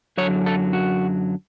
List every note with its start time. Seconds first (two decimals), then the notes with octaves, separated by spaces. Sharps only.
0.17 F#2 D3 F#3 C#5
0.46 A4
0.73 F#4